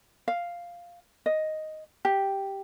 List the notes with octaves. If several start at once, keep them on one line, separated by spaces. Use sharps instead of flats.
F5
D#5
G4